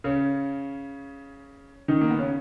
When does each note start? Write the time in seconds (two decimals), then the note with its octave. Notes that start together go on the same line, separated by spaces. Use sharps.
0.04 C#3 C#4
1.88 D#3 D#4
2.01 A#3
2.10 B3
2.19 C#3 C#4